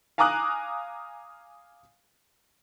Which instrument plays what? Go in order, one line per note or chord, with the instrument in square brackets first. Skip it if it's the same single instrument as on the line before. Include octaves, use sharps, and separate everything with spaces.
[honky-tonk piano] F5 G#5 A#5 D6 D#6 F#6